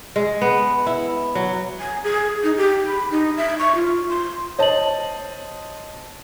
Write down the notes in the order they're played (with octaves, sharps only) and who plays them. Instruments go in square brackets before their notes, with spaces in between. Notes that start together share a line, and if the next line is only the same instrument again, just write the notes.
[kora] G#3
B3
E4
F#3
[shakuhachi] G#5
G#4
D#4
G4
B5
D#4
E5
C#6
F4
C6
[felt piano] C5 D#5 A5 [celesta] C#5 F#7